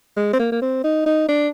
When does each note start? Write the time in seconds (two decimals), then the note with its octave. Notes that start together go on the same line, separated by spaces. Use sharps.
0.17 G#3
0.33 C4
0.39 A#3
0.52 A#3
0.62 C4
0.84 D#4
1.06 D#4
1.28 D4